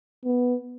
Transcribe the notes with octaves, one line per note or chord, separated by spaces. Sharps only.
B3